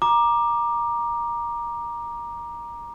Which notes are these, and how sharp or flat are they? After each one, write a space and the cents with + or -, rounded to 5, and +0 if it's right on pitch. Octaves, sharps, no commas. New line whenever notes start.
A#5 +15 D6 +15